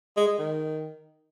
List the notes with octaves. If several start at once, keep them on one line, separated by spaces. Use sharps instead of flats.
G#3
G#3
D#3